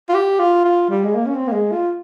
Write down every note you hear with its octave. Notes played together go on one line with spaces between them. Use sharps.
F4
G4
F4
F4
G3
G#3
A#3
C#4
C4
A#3
G#3
F4